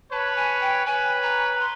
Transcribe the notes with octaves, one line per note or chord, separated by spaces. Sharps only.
B4 C#5 A5
G#5
G5
B4 C#5 G#5
A#5
C6